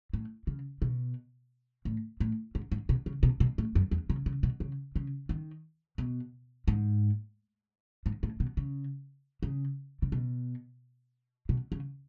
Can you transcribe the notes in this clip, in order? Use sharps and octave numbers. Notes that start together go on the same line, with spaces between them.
A2
C#3
B2
A2
A2
G#2
G#2
B2
C#3
B2
B2
A2
F#2
E2
C#3
C#3
B2
C#3
C#3
D#3
B2
G#2
G#2
A2
B2
C#3
C#3
C#3
B2
B2
C#3